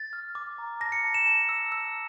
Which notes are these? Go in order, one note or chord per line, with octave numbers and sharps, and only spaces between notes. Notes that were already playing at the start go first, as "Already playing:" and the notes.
Already playing: A6
F6
D6
A#5
A5 A#6
C#7
A5
E7
A5
E6
E6